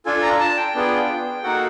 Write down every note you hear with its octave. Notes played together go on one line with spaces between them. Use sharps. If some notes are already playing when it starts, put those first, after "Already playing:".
D4 F4 A4 G#5
A#5
A5
G5
B3 D4 F4 G#4
A#3 D#4 F#4 A4 F#5